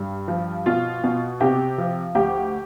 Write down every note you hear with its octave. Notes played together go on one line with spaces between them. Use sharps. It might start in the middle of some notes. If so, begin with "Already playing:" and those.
Already playing: G2
F3
B2 F4
B2
C3 G4
F3
D2 G4